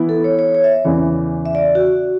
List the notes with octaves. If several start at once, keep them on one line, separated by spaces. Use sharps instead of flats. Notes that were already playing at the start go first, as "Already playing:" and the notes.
Already playing: E3 B3 E4
A4
C#5
C#5
C#5
E5
E2 C#3 E3
E5
D5
F#4